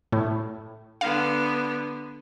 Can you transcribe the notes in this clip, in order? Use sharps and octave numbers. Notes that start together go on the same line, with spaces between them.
A2
D3 B3 F5